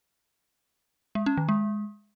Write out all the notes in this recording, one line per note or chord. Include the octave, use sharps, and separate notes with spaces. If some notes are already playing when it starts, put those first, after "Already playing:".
G#3
C#4
D#3
G#3